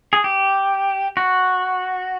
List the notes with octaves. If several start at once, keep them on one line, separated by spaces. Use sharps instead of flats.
G#4
G4
F#4